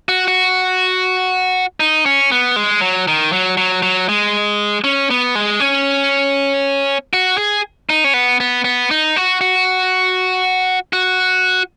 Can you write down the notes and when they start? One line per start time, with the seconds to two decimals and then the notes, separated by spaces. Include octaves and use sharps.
0.09 F#4
0.28 F#4
1.80 D#4
2.06 C#4
2.32 B3
2.56 G#3
2.81 F#3
3.08 D#3
3.33 F#3
3.57 F#3
3.83 F#3
4.09 G#3
4.84 C#4
5.11 B3
5.35 G#3
5.60 C#4
7.13 F#4
7.38 G#4
7.90 D#4
8.04 C#4
8.14 B3
8.40 B3
8.64 B3
8.91 D#4
9.16 F#4
9.41 F#4
10.93 F#4